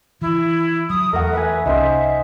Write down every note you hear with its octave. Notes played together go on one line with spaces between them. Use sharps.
E3 E4
F#3 D#6
E2 A3 A#4 F#5
B4 E5 G#5
C2 C#4 D#4 C5 E5 C6